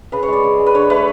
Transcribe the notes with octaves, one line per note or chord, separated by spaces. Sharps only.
C#3 B4
C#5
G#3 D5
C#3
G#3
B4
D3 C#5
A3 B4